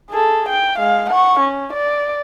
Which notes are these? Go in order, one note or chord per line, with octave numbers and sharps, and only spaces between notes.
G#4 A4
G5
G#3 F5
F#5 C#6
C#4
D5